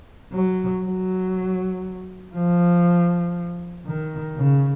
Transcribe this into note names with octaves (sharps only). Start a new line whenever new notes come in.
F#3
F#3
F3
D#3
C#3